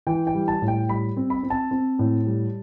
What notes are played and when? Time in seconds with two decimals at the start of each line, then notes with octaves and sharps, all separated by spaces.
0.07 E3 G5
0.27 G5
0.35 G3
0.48 A5
0.62 A2
0.68 G5
0.89 G3 B5
1.17 C4
1.30 B5
1.43 C4
1.50 A5
1.71 C4
1.99 A2
2.26 G3